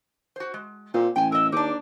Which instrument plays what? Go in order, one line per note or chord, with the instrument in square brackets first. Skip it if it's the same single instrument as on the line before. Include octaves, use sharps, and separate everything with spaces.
[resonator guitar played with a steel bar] F#4 C5
G#3
[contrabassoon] A#2 [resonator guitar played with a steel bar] C4 C5
[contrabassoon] A1 [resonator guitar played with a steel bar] G5 G#5
[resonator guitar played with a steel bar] A#4 D#5 [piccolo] E6
[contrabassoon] D#2 [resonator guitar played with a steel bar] D4 D#4 [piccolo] D6